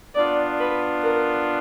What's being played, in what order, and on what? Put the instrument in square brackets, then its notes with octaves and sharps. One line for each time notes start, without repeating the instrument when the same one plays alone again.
[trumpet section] B3 D4 F4 [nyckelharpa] D5
[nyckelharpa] B4
A#4